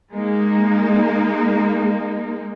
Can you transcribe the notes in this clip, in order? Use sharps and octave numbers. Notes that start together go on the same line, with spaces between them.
G#3 A#3 D#4